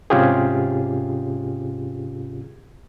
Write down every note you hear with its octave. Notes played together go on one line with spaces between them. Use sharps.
G#2 C3 C#4 F4 G4 G#4